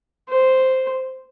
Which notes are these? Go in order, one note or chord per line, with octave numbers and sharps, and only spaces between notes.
C5